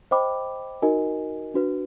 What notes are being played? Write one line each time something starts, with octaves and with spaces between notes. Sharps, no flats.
C5 D#5 G5 B5 D6
D#4 F#4 A#4 D#5 G#5
D4 F#4 B4